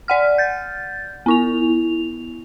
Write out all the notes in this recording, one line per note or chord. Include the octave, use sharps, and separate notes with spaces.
D5 F#5 F6
G6 A6
B3 E4 F7